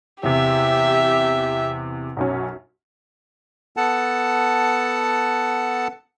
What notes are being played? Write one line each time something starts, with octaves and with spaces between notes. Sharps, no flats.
E2 C3 G4 E5
B1 F#2 C#4
B3 A4 F#5 A5